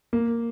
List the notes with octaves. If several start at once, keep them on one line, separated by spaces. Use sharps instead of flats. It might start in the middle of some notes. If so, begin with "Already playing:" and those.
A#3